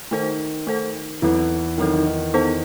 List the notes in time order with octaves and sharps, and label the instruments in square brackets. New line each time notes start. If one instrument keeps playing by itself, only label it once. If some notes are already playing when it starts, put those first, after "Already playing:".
[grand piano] D#3 [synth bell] A3 D#4 A4 C5
[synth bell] A3 D#4 A4 C5
[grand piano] E2 E3 [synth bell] F#3 C4 E4 A4
[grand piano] D#3 [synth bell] F#3 C4 E4 A4
[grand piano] D#3
D#3
[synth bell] B3 D#4 A4 C5